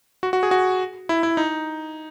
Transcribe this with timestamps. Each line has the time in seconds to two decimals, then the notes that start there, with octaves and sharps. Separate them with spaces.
0.23 F#4
0.33 F#4
0.43 G#4
0.51 F#4
1.09 E4
1.23 E4
1.37 D#4